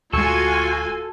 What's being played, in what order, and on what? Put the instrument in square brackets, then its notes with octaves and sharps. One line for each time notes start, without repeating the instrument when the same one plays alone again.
[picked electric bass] D1 G#3 [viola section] F4 F#4 G#5 [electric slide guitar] A4 [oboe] C#6